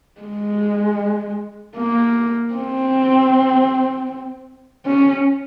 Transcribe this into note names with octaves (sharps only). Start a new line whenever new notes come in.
G#3
A#3
C4
C#4